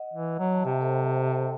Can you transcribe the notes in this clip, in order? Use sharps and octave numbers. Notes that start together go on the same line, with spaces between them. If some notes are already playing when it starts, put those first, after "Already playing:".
Already playing: D#5 F#5
E3
F#3
A5
C3 E5 G5
A4 C5